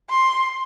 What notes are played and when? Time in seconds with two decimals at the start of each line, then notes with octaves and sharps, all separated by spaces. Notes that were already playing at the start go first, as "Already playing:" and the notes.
0.10 C6